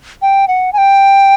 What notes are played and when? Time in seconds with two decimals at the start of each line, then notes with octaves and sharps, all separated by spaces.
0.22 G5
0.48 F#5
0.73 G#5
0.78 G5